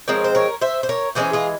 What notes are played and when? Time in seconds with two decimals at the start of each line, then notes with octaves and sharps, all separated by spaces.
0.08 F3 G#3 C4 A#4 C#5
0.24 C5
0.35 A#4 C#5
0.61 C5 E5
0.83 C5
0.89 A#4 C#5
1.15 E3 G#3 C#4 G#4 C5
1.33 F4 G#4